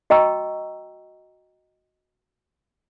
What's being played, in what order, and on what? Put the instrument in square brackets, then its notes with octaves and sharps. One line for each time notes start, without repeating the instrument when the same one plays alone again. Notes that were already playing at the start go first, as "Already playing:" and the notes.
[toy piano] F#4 D#5 G5 A#5 C#6 E6